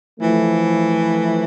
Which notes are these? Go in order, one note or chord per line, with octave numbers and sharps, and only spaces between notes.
E3 F3 A3